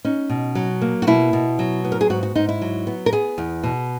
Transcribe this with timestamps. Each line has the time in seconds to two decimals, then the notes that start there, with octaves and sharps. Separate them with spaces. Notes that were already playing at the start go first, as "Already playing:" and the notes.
0.05 C#4 D#4
0.29 B2
0.55 F#3
0.82 A#3
1.02 F#4
1.07 B2 E4
1.33 B2
1.59 F#3
1.84 B3
1.92 A#4
2.01 G#4
2.10 G#2 F#4
2.23 F#4
2.36 G#2 D#4
2.49 E4
2.61 F#3
2.87 B3
3.06 A#4
3.12 B3 G#4
3.38 E2
3.63 B2